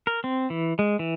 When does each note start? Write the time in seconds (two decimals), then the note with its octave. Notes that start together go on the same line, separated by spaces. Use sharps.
0.07 A#4
0.24 C4
0.50 E3
0.79 G#3
0.99 E3